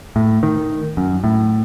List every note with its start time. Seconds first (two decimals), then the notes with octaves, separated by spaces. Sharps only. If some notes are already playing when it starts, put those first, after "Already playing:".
0.16 A2
0.43 D#3
0.97 F#2
1.24 A2